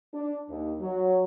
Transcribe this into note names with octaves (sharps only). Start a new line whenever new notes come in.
D4
D#2
F#3